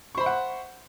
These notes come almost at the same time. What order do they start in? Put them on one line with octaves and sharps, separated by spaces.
C#6 C5 B5 E5 F#5